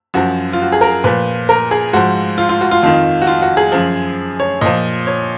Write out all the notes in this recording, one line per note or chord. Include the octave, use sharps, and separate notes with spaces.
F#2 F3 F#4
F4
F#4
G#4
A#4
A#2 F3 B4
A#4
G#4
G#2 F3 F#4
F4
F4
F#4
F4
F2 D#3 F4
F#4
F4
F#4
G#4
F#2 F3
C#5
A#2 F3 D#5
C#5